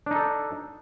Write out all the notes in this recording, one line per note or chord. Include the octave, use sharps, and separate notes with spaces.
D4 D#4 A4